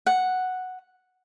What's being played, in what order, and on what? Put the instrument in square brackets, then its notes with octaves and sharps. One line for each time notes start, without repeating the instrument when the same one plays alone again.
[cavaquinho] F#5